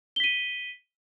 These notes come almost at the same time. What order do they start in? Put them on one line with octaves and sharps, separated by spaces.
G7 B6 D#7